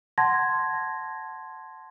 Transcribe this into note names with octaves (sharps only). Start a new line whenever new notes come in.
F#5 A5 C6 G#6 A#6